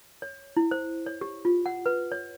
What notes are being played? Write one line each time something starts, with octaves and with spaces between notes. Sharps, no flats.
C#5
E4
C5
C#5
G4
F4
F#5
B4
C#5